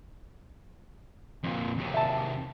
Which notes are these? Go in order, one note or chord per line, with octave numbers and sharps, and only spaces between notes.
F2 A#2
D#2 C3
E5 A5